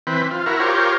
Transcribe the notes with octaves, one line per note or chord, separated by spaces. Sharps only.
E3 C4 B4
F4
E4 F#4 A#4
F4 G4 A#4 C5 C#5